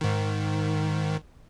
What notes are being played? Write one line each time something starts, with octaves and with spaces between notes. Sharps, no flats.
G#2 D#3